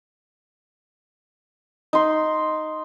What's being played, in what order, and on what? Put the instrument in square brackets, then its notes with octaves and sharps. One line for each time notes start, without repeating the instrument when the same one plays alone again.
[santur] D#4 C6